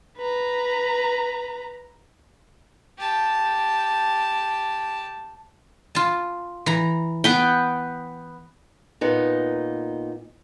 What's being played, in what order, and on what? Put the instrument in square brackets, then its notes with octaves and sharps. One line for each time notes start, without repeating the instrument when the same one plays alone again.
[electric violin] B4 A#5
[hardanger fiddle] G4 A5
[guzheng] F4 A5
E3 A#5
[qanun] B3 B4 G5
[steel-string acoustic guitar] A#2 B3 D#4